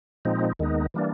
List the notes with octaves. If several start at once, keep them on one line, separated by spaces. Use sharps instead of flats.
A#2 F3 G#3 C4 D#4
D#2 D#3 G#3 B3 D#4
E3 G3 A#3 D4